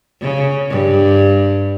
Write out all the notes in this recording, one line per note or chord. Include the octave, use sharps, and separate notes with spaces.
C#3
G2